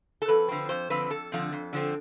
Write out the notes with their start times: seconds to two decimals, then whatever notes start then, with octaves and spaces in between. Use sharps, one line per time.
0.22 A4
0.28 F2 B4
0.48 D3 F3 C4
0.69 F2 C5
0.90 D3 F3 C4 B4
1.10 F2 A4
1.32 D3 F3 C4
1.52 F2
1.73 D3 F3 C4